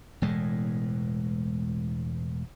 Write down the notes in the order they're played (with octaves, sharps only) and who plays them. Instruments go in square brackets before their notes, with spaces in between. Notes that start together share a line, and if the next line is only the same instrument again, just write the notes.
[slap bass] E1 E2 A2 G#3